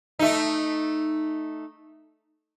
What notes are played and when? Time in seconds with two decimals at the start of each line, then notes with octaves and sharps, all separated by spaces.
0.19 A3 D#4